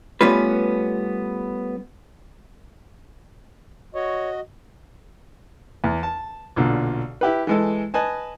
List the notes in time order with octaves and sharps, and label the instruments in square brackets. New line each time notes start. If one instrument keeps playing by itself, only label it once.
[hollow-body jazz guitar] G3 A3 B3 C#4 F4 B4
[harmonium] F#4 D#5 [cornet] C#5
[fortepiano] E2
A5
B1 A#2 D3
E4 G4 B4
E3 G#3 A4
B4 D#5 G#5 A5